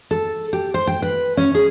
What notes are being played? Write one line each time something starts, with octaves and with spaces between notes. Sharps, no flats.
A4
G4
C5
G5
B4
C#4
G#4